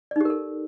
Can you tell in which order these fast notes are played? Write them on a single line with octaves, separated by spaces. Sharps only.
D5 D#4 G4 A#4 A4